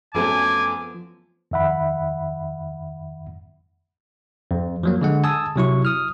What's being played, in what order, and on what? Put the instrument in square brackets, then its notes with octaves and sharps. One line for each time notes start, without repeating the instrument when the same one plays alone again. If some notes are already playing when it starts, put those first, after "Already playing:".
[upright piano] F#2 A3 A5 [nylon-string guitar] F3 B3 C4 [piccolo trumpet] G#5 [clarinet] D6
[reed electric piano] F2 D#3 E5 F#5 B5
[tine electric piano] F2
F3 F#3 A#3
D3 G#3 F#5
G#5 A5 D#6 E6
C3 F#3 E4 C#6
D#6 F6